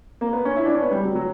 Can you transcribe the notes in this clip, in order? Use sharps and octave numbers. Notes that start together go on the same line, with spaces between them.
A#3
B3
C#4
E4
D4
C#4
B3
G3
F#3
F#3